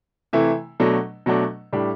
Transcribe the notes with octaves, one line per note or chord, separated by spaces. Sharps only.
C3 E3 A3 E4
B2 F#3 A3 D4
B2 F#3 A3 D4
A2 G3 D4 G4